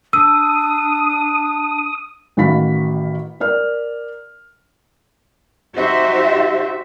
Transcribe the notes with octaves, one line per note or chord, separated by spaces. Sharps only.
D4 D#6 E6
A1 D#3 F#4 F5 B5 B6
A#4 D5 F6
D#4 F#4 G4 C5 E5